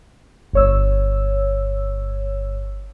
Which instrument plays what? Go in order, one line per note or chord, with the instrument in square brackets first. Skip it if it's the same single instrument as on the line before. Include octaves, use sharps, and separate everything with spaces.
[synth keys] G1 C#5 E6